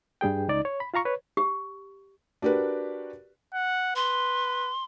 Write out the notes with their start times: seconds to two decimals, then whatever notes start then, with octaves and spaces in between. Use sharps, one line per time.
0.21 G2 G3 G#4 G5
0.48 C#2 D#4 D5
0.65 C#5
0.80 B5
0.94 F4 F5 A#5 C#6
1.05 B4 C#5
1.37 G4
2.42 D4 F#4 G4 A#4 B4
3.54 F#5
3.96 B4 C6